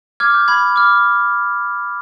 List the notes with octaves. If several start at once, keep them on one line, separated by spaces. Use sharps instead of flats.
D6 F6 G#6
G6
B5 G#6
D6 F6